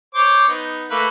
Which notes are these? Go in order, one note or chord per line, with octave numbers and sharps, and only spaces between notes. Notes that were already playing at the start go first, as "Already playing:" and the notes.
C5 C#5 D6
B3 D#4
A3 A#3 B4